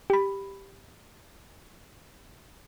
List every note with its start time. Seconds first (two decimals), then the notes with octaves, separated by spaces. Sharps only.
0.10 G4 B5